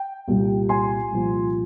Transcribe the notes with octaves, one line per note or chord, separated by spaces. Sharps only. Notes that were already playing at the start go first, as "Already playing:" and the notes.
Already playing: G5
C2 A#2 G3
G#5 C6
C2 A#2 F3